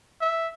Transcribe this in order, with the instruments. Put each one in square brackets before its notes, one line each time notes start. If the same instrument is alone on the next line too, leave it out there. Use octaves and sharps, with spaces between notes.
[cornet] E5